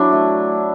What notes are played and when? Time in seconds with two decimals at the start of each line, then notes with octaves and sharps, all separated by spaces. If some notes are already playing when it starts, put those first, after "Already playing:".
Already playing: F#3 D4 E4
0.12 A3